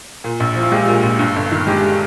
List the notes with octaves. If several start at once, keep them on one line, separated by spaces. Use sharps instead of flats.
A#2
A#1
F3
F4
G#3 G4
A#2
A#1
G2
G1
D#3
G#3 G4